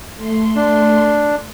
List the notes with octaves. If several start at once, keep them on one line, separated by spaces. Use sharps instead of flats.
A3 C6
D4